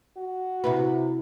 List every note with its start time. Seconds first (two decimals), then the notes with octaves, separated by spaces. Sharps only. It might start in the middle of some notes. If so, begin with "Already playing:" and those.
0.17 F#4
0.64 C3 E4 B4